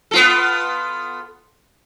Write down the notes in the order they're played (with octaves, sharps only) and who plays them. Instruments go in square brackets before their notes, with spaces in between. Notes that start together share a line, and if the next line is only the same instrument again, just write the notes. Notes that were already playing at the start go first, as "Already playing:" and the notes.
[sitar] B3 F4 A4